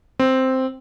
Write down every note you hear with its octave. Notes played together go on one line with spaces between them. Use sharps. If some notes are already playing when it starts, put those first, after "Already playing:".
C4